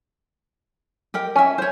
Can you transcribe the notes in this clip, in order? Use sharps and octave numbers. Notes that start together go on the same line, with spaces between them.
G4 A#4 G5
C#4 E5 G#5
C5 C#5